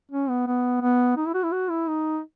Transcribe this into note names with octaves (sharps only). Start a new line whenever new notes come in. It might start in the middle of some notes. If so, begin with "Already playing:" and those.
C#4
B3
B3
B3
D#4
E4
F#4
E4
F#4
E4
D#4